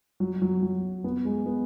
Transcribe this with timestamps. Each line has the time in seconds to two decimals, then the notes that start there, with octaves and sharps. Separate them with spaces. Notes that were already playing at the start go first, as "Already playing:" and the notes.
0.20 F#3
0.42 F#3
0.63 F#3
1.04 B3
1.25 G#3
1.46 B3